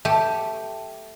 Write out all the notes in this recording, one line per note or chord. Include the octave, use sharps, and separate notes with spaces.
A3 G4